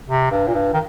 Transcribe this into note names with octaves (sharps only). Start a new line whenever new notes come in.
C3
G2
A#2
G2
D#3